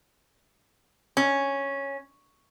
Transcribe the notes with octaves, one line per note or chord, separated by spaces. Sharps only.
C#4